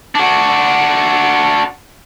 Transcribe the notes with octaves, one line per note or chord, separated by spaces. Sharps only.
D4 F#4